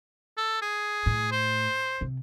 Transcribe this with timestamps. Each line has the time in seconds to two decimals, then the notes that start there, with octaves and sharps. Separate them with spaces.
0.38 A4
0.62 G#4
1.06 A2
1.32 C5
2.01 C3